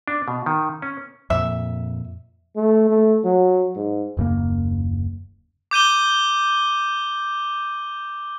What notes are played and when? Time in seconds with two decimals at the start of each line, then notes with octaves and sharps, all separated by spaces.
0.08 D4
0.28 B2
0.46 D#3
0.82 C#4
1.30 F2 A#2 E5
2.56 A3
2.90 A3
3.25 F#3
3.76 G#2
4.17 D#1 F#2 C#3 A#3
5.71 D6 G6 D#7 G7